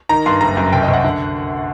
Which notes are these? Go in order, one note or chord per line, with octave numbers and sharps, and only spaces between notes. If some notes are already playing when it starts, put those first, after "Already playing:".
D#3 A#5
G2 C6
F#1 A#5
F#2
C2 G5
D#5
C2
F#5
D3